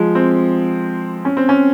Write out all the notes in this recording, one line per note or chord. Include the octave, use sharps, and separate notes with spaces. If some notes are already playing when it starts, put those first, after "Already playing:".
Already playing: F3 G#3
C4
C#4
C4
C#4